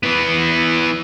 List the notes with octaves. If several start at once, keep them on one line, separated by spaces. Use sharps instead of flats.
E3 B3